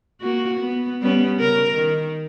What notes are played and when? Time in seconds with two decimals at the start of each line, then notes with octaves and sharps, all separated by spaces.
0.21 A#3 F#4
0.60 B3
1.01 G3 B3 C#4
1.37 C#3 A#4
1.74 D#3